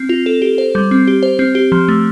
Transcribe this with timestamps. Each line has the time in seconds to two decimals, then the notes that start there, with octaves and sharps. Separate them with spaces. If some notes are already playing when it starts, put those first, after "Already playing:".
Already playing: C4
0.09 F4
0.26 A4
0.42 G4
0.58 C5
0.75 G3
0.91 C4
1.07 G4
1.23 C5
1.39 C4
1.55 G4
1.72 F3
1.88 A3